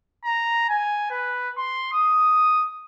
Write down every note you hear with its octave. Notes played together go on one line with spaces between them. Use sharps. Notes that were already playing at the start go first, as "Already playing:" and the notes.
A#5
G#5
B4
C6
D#6